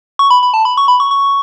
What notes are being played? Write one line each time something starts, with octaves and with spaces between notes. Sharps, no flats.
C#6
B5
B5
A5
B5
C#6
B5
C#6
C#6